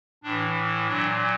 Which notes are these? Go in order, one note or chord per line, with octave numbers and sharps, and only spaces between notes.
A2 E3 D4
A#2 F#3 D4